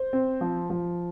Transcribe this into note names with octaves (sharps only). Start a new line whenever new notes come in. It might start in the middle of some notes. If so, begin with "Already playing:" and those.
Already playing: C5
C4
F3
F3